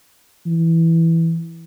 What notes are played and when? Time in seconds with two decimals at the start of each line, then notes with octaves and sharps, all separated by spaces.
0.46 E3